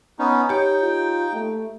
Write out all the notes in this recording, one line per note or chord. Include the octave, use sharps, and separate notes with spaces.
B3 C#4 D#4
D#4 G4 C#5 G5
F4
A3